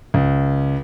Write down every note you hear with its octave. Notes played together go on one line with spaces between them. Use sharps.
C#2